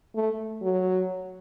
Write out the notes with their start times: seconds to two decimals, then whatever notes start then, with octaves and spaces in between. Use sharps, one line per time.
0.15 A3
0.62 F#3